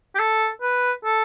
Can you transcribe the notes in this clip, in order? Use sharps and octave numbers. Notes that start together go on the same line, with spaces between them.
G4
A4
B4
A4